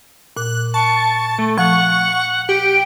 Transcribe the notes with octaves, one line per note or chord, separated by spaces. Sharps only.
A#2 F#6
A5 C#6
A3
F3 F#5 C#6
G4 D7